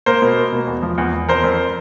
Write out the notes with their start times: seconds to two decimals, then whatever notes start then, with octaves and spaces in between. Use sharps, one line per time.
0.06 A#3 A#4 C5
0.22 B2
0.37 A#3
0.52 B2
0.67 E2
0.83 F3
0.98 E2
1.14 E2
1.29 F2 A#4 C5
1.44 F2